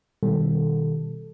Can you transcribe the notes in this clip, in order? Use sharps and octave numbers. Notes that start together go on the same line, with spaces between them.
B2 D#3 G3 A4